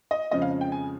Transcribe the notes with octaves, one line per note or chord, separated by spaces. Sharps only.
D#5
F2 C#3 F3 G#3 C#4 D#5
F5
G5
G#5